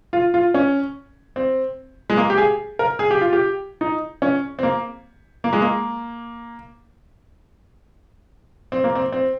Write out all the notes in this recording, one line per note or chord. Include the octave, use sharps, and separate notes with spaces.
F4
F4
C#4
C4
G#3
A#3
G4
G#4
A#4
G#4
G4
F4
G4
D#4
C#4
C4
A#3
A#3
G#3
A#3
C4
A#3
C4
C4